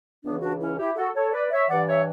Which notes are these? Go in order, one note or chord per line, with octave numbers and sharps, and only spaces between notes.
C#2 C#3 E3 B3 D4
D4 F#4
C#4 E4
E4 G4
F#4 A4
A4 C#5
B4 D5
C#5 E5
G2 E3 D5 F#5
C#5 E5